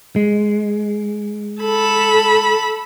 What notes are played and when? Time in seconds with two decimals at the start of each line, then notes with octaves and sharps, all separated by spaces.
0.16 G#3
1.62 A4 B5